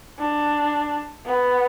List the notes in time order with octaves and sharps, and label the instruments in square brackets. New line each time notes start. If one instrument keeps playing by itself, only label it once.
[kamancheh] D4
B3